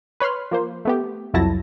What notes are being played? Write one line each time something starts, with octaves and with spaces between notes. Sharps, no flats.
B4 C#5 B5 C6 F6
F3 A#3 C5
A3 B3 G4
C2 F2 F#3 E4 A5 A#6